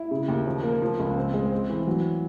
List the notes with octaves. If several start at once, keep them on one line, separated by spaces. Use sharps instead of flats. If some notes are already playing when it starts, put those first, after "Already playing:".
Already playing: E4
C#3
D#2
F3
A#3
F3
C#2
C4
G#3
C4
E3
F#3